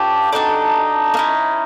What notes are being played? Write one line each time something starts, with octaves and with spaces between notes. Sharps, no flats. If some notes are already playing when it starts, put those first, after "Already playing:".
Already playing: C#4 F4 G4 A4
D4 D#4 F#4 A4 D5
A#3
C#4 E4